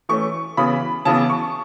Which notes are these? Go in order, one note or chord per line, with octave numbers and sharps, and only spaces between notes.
E3 A3 C#4 C#6
C#3 E3 B3 B5
C#3 E3 B3 A5
C#6